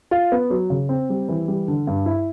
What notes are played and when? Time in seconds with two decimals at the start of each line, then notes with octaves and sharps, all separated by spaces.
0.11 F4
0.32 B3
0.50 F#3
0.70 C#3
0.89 C4
1.10 G3
1.29 E3
1.48 G3
1.68 D3
1.87 G2
2.06 E4